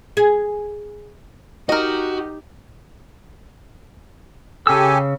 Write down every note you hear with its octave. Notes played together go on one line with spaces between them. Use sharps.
G#4
D#4 F#4 G4 A#4 D#5
C#3 G4 A4 G#5 E6